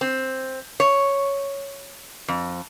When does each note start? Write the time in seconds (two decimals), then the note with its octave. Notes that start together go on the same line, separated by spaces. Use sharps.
0.01 C4
0.80 C#5
2.28 F2